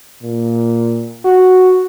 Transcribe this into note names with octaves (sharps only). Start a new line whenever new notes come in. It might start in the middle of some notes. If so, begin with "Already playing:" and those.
A#2
F#4